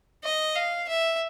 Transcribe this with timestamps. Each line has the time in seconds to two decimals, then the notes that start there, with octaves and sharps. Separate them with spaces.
0.24 D#5
0.56 F5
0.89 E5